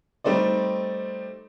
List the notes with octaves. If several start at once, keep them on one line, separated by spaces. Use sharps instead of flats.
G3 A3 C4 D#4 D5